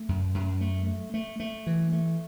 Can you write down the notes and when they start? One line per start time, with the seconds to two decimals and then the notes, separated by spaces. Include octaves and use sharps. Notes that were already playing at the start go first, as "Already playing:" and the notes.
Already playing: A3
0.09 F#2
0.34 F#2
0.61 A3
0.87 A3
1.14 A3
1.40 A3
1.67 E3
1.92 A3